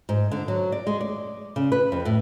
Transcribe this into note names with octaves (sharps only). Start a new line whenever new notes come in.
G#2
D3
F#3
D5
G#3
D5
C#3
B4
F2
A2